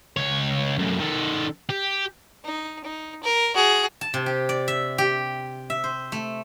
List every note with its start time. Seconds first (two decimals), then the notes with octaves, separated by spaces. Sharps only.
0.17 C#2 C#5
0.78 F#2 A2
0.99 D#3 A4
1.69 G4
2.45 D#4
2.84 D#4
3.23 A#4
3.55 F#4 G#4
4.01 A5
4.14 C3
4.26 G4
4.49 D5
4.68 E5
4.98 G4
5.70 E5
5.84 C5
6.12 A3